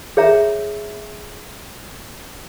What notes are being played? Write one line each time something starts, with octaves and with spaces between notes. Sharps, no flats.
G#4 C#5 E5 A#5